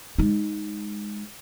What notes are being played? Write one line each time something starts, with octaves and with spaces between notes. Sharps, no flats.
G#3 D#4